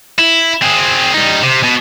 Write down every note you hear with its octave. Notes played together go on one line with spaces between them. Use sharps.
E4
C4 G#4
G3 D#4
C3
B2